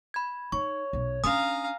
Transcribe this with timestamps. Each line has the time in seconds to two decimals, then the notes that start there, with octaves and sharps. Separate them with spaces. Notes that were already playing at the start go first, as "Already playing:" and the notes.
0.14 B5 G#6
0.52 D#4 C#5 C#6
0.93 B1 D#4
1.24 C#4 D4 F5 G#5 A#5 D#6